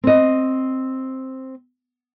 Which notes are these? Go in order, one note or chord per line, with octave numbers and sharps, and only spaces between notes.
C4 D#5